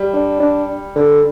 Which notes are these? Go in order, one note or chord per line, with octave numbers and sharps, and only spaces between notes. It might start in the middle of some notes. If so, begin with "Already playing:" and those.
Already playing: G3
D4
D4
D3